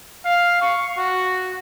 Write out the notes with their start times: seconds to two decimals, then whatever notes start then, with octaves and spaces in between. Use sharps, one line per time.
0.25 F5
0.61 C#6
0.97 F#4